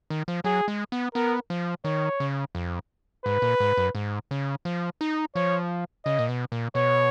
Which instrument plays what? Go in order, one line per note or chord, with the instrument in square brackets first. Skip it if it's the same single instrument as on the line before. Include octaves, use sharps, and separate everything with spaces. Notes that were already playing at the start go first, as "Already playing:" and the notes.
[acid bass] D#3
F3
[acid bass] F#3 [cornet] G#4
[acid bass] G#3
B3
[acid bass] B3 [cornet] A#4
[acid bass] F3
[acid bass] D#3 [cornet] C#5
[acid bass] C#3
F2
[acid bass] G#2 [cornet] B4
[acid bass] A#2
G#2
F#2
G#2
C#3
F3
D#4
[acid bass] F3 [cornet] C#5
[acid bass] C#3 [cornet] D#5
[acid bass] A#2
B2
A#2
[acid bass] B2 [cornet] C#5